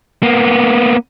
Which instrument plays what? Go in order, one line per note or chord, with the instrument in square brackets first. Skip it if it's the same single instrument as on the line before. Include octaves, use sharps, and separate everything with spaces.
[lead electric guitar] A#3 B3